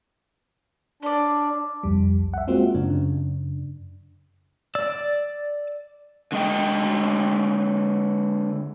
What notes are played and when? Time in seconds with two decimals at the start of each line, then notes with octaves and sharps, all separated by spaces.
1.02 C#4 D4 D5
1.83 C2 F2 G3
2.34 E5 F#5
2.47 G#3 A#3 C4 F4 F#4
2.75 F#2 C#3 D4
4.75 D5 E6
6.32 D3 G#3 D#5 G5